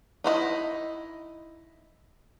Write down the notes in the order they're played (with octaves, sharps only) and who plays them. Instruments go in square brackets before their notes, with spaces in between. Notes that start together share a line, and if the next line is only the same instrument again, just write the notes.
[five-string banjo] D#4 E4 F#4 D#5